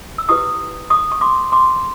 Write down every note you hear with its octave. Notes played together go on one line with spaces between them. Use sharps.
E6
E4 G4 B4 C#6 D#6
C#6 D#6
C#6
C6 D6
C6 D6